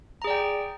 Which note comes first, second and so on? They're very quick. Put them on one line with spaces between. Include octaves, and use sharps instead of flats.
A#5 G#4 D5 G5